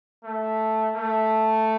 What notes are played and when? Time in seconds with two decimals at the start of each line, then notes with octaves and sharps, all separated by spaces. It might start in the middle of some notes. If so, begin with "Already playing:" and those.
0.24 A3
0.96 A3